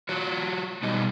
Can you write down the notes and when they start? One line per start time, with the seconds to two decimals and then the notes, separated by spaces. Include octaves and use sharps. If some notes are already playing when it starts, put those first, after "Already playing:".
0.09 F4 F#4 C#5
0.83 B2 G3 D#4 D#5